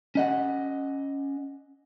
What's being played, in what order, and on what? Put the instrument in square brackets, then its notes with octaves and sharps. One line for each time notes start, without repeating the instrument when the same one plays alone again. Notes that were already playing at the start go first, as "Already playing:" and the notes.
[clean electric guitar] C#4 D#5 F#5